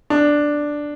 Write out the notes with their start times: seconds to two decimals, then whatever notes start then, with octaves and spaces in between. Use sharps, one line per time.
0.10 D4